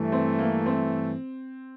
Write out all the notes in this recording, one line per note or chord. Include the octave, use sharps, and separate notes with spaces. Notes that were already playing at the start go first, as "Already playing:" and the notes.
Already playing: G2 E3 A3
C4
A#3
C4